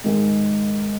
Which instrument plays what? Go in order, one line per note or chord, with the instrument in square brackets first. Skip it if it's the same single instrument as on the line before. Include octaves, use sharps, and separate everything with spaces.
[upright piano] G#2 D#3 G#3